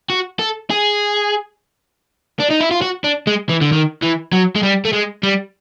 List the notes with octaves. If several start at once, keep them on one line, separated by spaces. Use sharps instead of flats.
F#4
A4
G#4
D4
D#4
E4
F4
F#4
D4
G#3
E3
D3
D#3
E3
F#3
G#3
G3
A3
G#3
G3